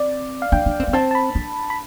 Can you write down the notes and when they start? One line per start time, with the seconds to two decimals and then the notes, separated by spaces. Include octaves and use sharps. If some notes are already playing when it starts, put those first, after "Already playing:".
Already playing: C4 D5
0.42 F5
0.52 D4 G5
0.66 D4
0.80 C4
0.88 B3
0.93 C4 A5
1.11 A5
1.15 B5
1.35 D4
1.70 B5